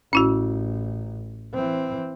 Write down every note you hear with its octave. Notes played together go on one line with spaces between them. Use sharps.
A1 C#4 E4 F#4
E3 C4